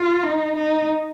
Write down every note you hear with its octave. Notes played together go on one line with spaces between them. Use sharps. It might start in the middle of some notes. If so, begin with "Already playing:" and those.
Already playing: F4
D#4
D#4